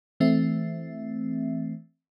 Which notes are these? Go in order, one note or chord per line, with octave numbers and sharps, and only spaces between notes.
E3 A3 C4 E5